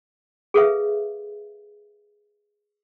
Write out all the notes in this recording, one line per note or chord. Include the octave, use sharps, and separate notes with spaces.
G#4 A4 B4 E5 F5